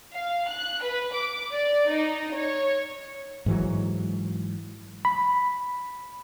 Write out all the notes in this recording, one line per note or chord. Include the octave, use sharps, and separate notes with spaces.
F5
F#6
B4
D6
D5
D#4
C#5
G#2 E3 F#3
B5